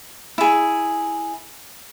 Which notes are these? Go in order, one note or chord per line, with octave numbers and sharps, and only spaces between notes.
E4 G#4